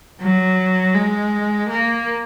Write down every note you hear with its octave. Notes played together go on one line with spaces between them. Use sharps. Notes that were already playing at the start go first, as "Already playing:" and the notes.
F#3
G#3
A#3